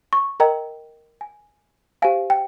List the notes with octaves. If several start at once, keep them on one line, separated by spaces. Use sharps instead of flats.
C#6
A#4 D#5 G5 A#5
G#5
G4 C5 F5 G#5
G5